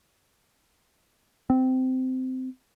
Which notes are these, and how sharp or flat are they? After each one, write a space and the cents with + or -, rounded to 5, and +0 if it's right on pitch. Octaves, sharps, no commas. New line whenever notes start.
C4 -20